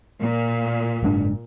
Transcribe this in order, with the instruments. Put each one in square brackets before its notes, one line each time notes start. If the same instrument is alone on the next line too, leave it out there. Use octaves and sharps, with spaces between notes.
[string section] A#2
[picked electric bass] F#1 G#2 D4